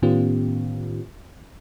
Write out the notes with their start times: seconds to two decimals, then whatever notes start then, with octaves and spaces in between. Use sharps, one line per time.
0.02 A2 D#3 B3 C#4 F4 G4